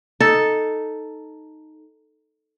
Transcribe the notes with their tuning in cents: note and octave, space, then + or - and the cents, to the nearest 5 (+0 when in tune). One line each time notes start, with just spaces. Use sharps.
D#4 +0 A4 +0